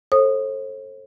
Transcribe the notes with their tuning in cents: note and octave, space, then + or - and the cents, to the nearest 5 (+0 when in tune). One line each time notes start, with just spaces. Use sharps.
A4 +0 C5 +45 D#6 -15